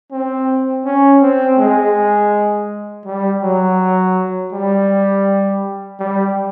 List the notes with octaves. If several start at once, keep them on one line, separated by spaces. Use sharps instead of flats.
C4
C#4
C4
G#3
G3
F#3
G3
G3